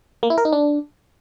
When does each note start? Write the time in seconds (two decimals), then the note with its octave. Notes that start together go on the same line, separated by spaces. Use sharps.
0.23 A#3
0.30 E4
0.38 A#4
0.45 D#4
0.53 D4